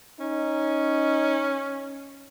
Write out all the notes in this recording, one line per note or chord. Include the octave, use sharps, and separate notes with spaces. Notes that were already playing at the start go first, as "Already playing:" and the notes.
C#4 D#4